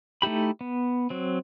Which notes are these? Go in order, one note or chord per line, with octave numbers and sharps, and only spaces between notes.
A3 D#4 E4 G4 B5
B3
F#3 C4